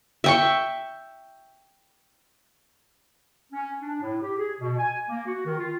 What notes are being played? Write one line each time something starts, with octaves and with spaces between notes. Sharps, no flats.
E5 G5 C#6
C#4
D4
A2
G4
G#4
B2
G#5
A#3
F#4
D#3
F4